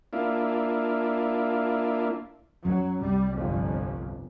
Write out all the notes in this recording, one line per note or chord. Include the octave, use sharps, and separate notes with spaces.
A#3 D4 E4 F4
F#2 F#3
C2 G3
G1 F2